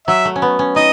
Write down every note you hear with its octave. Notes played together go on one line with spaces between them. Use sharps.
F#3 E5
A3
C#4
B3
C#4
D#4 D#5